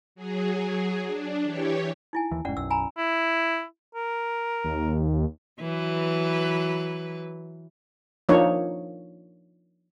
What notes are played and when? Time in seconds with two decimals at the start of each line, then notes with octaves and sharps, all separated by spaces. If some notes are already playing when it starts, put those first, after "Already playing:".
0.15 F#3 G#4
1.07 D4
1.43 E3 G4 C#5
2.13 D#4 E4 G#5
2.31 D#2 E3
2.45 F1 G#2 C#4 D5 F#5
2.57 B1 F#2 E6
2.70 G#5 A#5 B5
2.98 E4
3.95 A#4
4.64 D#2
5.60 E3 F#3 B4
8.29 F3 A#3 D4 D#4 C#5